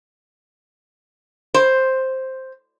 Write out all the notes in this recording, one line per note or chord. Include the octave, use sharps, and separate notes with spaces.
C5